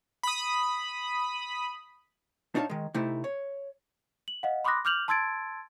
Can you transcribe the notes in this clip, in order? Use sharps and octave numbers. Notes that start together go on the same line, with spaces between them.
B5 D#6
D4 D#4 C#5 F5 A5
D#3 G#3
C3 A3 D#4 E4
C#5
F#7
D#5 F5 F#5
B5 C6 D6 D#6 F#6 A#6
D6 F6 G6 F7 F#7
A5 C6 E6 G#6 A6 D7